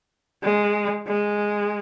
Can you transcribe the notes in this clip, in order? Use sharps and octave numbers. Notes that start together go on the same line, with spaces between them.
G#3
G#3